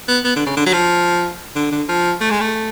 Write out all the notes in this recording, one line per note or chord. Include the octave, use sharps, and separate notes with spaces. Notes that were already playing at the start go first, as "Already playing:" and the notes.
B3
B3
D3
C#3
D3
F#3
F3
D3
D3
F3
A3
G#3
A3